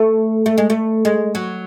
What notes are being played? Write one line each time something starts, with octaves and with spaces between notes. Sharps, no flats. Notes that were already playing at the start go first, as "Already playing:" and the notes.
Already playing: A3
A3
G#3
A3
G#3
F#3